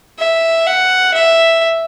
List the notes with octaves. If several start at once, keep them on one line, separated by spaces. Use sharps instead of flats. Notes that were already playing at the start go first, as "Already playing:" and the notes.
E5
F#5
E5